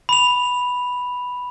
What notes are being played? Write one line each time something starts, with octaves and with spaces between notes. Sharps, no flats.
B5 F7